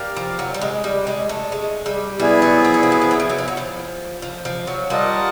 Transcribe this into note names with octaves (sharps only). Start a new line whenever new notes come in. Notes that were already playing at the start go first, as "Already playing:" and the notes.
Already playing: G4 A#4 D5 F5
F3
F#3
G3
G#3
G3
G#3
A3
G#3
G3
G3 B3 E4 G#4
F#3
F3
F#3
F3
F#3
F3
F#3
F3
F#3
F3
F#3
F3
F3
F3
F#3
G3 F4 A#4 D#5 F#5 A5